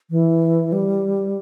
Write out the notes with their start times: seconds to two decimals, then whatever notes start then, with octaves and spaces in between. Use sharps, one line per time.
0.10 E3
0.72 G3